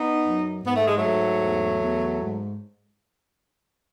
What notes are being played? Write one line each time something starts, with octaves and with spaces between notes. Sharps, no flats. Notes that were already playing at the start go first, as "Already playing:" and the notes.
Already playing: B3 D#4
F#2
G#2 B3
A3
G#3
F#3 A3
G#2
E2
E2
G#2